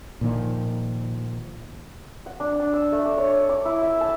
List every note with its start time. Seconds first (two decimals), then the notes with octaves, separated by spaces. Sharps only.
0.21 A#2 D#3 F3
2.26 F#5
2.40 D4
2.60 D4
2.73 E6
2.92 A3
3.05 D4
3.18 C#5
3.49 D6
3.65 E4
3.82 E5
4.01 A5